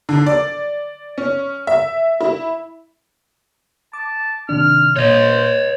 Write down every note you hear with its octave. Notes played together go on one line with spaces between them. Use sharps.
D3
D5
C#4
E5
E4
A5 D6
C3 D#3 D4 F6
A#2 C5 C#5 D#5